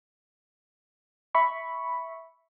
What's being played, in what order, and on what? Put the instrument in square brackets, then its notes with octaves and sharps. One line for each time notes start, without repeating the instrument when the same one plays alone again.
[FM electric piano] E5 B5 C#6